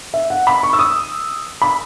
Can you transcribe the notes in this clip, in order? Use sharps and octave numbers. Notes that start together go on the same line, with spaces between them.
E5
F#5
B5
C#6
E6
D#6
B5